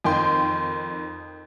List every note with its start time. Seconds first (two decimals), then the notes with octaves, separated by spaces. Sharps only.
0.04 F2 D#3 G5 C6